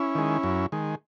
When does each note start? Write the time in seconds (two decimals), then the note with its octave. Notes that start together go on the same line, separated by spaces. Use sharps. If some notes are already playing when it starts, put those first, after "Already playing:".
Already playing: C#4 E4
0.15 D#3 G#3
0.43 F#2
0.72 D#3 G#3